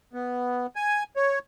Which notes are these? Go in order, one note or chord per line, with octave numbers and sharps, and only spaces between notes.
B3
G#5
C#5